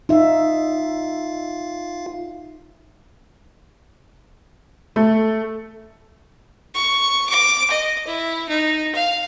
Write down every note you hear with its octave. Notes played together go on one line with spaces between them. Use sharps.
D#4 F4 E5 F5
A3
C#6
D6
D#5
E4
D#4
F5